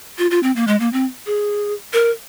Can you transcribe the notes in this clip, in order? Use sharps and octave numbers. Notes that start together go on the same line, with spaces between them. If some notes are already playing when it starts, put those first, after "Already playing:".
F4
F4
C4
A#3
G#3
A#3
C4
G#4
A#4